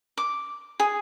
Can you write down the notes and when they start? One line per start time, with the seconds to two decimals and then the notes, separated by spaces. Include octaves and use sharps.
0.17 D6
0.80 G#4